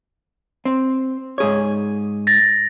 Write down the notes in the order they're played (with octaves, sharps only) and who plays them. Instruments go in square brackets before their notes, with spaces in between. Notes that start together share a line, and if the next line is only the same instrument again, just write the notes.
[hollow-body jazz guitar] C4
G#2 G#4 C#5
[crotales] A6 A#6